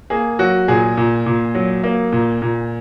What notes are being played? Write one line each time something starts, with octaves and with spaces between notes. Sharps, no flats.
A#3 G#4
F#3 F#4
A#2 G#4
A#2
A#2
F#3
A#3
A#2
A#2